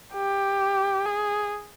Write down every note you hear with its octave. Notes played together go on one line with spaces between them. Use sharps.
G4
G#4